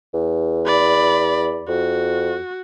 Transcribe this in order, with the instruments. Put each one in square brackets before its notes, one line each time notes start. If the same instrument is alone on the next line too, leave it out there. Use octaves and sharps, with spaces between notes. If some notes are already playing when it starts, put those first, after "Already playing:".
[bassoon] E2
[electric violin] D5 B5
[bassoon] F2 [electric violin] F#4